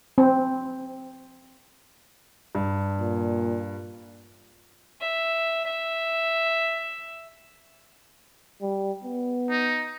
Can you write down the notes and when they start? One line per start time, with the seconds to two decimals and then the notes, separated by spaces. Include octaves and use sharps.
0.18 C4
2.55 G2
3.00 A#2
5.01 E5
5.66 E5
8.62 G3
9.05 B3
9.50 D#4